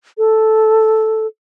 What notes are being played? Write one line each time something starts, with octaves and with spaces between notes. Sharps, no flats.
A4